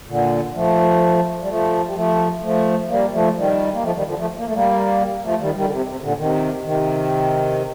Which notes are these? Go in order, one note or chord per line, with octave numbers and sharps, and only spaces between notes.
A#2 D3
F3 A3
G3
F3 A3
G3
F3 A3
F3 A3
G3 A#3
F3 A3
D#3 G3
A#3
F3 A3
D#3 G3
D3 F3
F3 A3
A#3
A3
G3 A#3
F3 A3
D#3 G3
D#3 G3
D3
C3
C3
A#2 D3
C3 D#3
C3 D#3